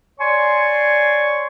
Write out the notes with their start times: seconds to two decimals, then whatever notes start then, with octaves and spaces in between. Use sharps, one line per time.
0.20 C#5 D5 G#5 C6 C#6